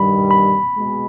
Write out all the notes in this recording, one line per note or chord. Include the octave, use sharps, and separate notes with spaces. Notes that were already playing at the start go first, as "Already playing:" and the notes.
Already playing: G2 D#3 G3 B5
B5
B2 G#3